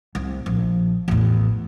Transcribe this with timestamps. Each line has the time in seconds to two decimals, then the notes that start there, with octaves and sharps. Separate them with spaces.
0.15 C2
0.46 A#1
1.08 A1 E2